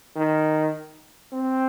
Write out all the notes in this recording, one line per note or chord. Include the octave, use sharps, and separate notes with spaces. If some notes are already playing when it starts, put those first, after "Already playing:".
D#3
C4